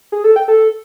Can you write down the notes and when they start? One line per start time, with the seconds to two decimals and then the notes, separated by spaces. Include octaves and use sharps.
0.12 G#4
0.24 A4
0.36 G5
0.48 A4